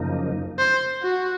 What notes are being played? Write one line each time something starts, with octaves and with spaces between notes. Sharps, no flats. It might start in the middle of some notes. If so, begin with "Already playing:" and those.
Already playing: F#2 C#3 F3 A#3 D#4
C5
F#4